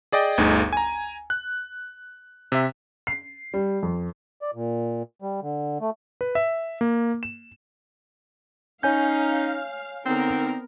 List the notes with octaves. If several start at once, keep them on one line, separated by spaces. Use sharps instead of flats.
G#4 D5 D#5 G5
G1 D2 D#4 G#4
G#5 A#5
F#6
C3 E5
C7
G3
F2
D5
A#2
G3
D3
A3
B4
E5
A#3
E7
C#4 D#4 C#5 F5 G#5 G6
D3 B3 C4 D#4 A#4